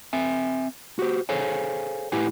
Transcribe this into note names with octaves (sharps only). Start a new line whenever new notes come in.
C4 E5 G#5
F#4 G4 C5
G#4 A4 C5 C#5 F5 G#5
A2 E4 G4 B4 F#5 G#5